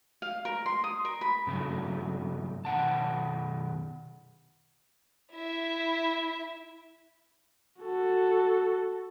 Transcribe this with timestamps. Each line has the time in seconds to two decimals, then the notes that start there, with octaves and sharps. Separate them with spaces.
0.22 F5
0.45 A#4
0.66 C6
0.84 D#6
1.05 A#4
1.21 B5
1.47 G2 C#3 F#3 A3
2.65 B2 D#3 F#5 A5
5.33 E4 E5
7.81 F#4 A4